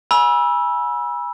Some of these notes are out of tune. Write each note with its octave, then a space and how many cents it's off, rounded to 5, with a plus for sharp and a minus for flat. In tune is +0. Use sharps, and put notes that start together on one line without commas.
G#5 +0 B5 -30 E6 +0